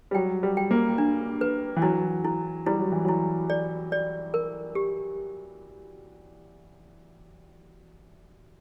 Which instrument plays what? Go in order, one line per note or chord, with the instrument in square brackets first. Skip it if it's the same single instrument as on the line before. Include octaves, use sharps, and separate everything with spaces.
[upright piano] G3
[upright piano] F#3 [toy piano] G5
[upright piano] G3
[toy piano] G5
[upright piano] A#3
[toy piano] D4
B4
[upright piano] E3
[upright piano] F#3 [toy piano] E4
[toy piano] E4
[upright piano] G3 [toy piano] E4
[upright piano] F#3
E3
[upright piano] F#3 [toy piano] E4
[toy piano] D5
D5
A#4
G4